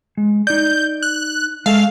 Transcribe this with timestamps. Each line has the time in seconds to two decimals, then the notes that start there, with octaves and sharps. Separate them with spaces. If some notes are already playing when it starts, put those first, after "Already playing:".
0.17 G#3
0.47 D#4 D5 G6
1.02 F#6
1.66 G#3 A4 E5 F5